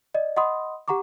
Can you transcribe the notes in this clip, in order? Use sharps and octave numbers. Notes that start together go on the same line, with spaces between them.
D5 D#5
D#5 F#5 B5 C6 D#6
G4 F#5 A#5 C#6 D6